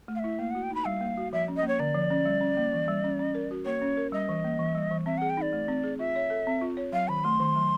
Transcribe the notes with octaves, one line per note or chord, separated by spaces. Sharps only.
A3
F5
E4 E5
A#3 F5
F#4 F#5
G5
D#4 B5
G3 F5
A#3
F#4
F3 E5
C#4
D#5
A#3 C#5
D3 D5
F3
C#4
G3
C#4
A#3
E3
G3
C#4
C#4
A#4
F#4
A#3 C#5
C#4
A#4
G3 D#5
E3
A#3
E3
G3
E3
C4 E5
G#4 F#5
G5
D#4 D5
A3
C4
G#4
F4 E5
C#5
A4
C4
F4
C#5
F#3 F5
D#3 B5
A3 C6
D#3
F#3